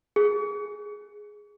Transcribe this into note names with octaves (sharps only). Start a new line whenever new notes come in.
G#4